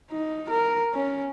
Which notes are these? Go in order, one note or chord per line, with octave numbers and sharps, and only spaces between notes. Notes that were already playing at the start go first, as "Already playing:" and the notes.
D#4
A#4
C#4